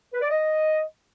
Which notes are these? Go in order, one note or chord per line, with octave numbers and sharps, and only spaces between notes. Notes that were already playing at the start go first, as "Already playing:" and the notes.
B4
D5
D#5